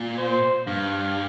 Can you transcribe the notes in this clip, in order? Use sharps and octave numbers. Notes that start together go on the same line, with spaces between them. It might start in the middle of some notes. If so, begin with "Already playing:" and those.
Already playing: A#2
C5
G2 F5